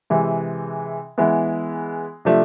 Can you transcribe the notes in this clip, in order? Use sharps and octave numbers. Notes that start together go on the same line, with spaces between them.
C3 E3 G#3
E3 G#3 B3 E4
C3 F3 A3 D4